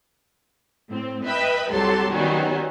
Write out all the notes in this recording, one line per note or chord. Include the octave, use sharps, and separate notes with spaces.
A2 C4
B4 D#5 E5 G5 B5
C2 F#3 G4 A4 A5 C6
D#3 F#3 G3 B3 C#4 F#4